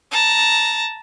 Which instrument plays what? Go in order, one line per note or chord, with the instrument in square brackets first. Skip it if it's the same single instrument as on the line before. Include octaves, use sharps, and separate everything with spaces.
[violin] A5 A#5